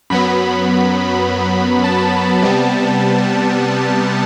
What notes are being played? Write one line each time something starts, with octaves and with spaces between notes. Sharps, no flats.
F#2 F#3 B3 B5
A5
C3 G3 B3